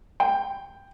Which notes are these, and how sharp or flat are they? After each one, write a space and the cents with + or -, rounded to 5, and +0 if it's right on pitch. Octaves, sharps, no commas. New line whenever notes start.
G5 +10